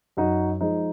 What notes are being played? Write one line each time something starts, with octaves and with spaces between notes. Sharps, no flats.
F#2 D#4 F#4
F3 G#3 D#4